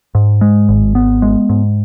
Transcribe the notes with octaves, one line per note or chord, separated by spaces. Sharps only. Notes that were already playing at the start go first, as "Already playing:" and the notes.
G#2
G#3
G#1
B3
G#3
G#2